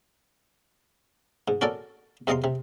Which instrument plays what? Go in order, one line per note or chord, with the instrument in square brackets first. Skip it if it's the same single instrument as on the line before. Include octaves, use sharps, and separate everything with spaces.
[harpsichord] G#2
C#4 F#4 A4 A#4 D5
E2 C3 D#5 F5 A#5 C6
C3